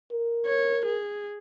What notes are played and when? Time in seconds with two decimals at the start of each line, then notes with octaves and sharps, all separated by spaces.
0.11 A#4
0.46 C#5
0.86 G#4